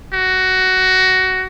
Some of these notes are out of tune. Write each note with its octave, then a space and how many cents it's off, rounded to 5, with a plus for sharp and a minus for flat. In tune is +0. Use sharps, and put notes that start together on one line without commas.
F#4 +15